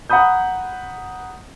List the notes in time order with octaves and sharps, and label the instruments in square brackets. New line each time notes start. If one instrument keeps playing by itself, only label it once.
[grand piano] F#5 A#5 B5 D#6 G6